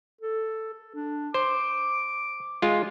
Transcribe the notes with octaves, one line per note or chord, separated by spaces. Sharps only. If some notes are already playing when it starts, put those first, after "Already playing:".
A4
A4
D4
C5 D6
G#3 F4